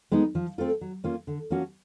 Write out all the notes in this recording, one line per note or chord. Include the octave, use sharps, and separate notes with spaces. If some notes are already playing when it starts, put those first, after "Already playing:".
G#3 B3 D#4
F3
A3 C4 F4 A4
F#3
A#3 C#4 F4
D3
F3 A#3 C#4 F#4